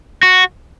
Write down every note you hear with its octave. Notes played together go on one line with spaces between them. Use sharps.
F#4